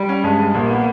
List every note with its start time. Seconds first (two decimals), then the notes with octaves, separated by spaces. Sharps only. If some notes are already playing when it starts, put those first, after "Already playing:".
Already playing: G3
0.09 C#4
0.24 G2 G#3
0.40 G3
0.54 A#1 A#3
0.69 B3